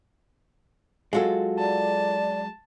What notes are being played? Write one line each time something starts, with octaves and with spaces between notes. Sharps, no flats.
F#3 G#3 F4 F#4 A4
D5 A5